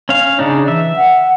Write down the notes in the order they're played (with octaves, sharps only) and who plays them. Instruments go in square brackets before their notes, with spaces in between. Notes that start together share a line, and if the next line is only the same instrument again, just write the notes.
[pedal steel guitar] C#4 F5
C#3 D4 D#4
[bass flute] E3 [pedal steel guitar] E5
[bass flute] F#5